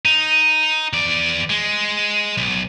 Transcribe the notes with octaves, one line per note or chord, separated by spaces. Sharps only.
D#4
E2 D5
G#3
B1